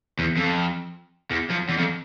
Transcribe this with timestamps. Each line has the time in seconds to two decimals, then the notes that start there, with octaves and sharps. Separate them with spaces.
0.19 E2
0.37 F2
1.31 E2
1.50 F2
1.69 E2
1.78 F2